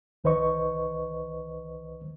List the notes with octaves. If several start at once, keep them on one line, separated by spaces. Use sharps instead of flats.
C2 D#3 B4 C5 D#5 C#6